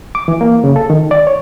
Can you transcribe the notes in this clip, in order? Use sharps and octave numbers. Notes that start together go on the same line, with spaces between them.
D6
E3
A#3
C#3
A4
D#3
D5
C#5